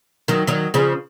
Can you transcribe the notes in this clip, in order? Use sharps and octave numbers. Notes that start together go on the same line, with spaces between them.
D#3 F#3
D#3 F#3
C#3 F3